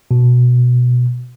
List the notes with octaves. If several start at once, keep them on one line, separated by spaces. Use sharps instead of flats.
B2